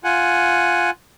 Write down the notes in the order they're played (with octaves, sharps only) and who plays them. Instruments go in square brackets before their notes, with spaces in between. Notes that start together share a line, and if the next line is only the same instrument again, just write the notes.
[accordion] F4 F#5 G#5